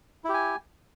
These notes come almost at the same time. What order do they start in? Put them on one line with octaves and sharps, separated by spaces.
E4 G4 G#5